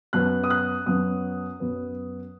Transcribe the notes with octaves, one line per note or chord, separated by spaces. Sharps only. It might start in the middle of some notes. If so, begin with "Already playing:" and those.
F#2 F#3 B3 F#6
D#6
F#6
F#2 F#3 B3 D#6
F#2 F#3 B3